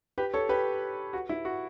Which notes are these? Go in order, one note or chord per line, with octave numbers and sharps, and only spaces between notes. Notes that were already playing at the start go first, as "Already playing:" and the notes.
G4 B4
A4 C#5
G4 B4
F#4
E4
F#4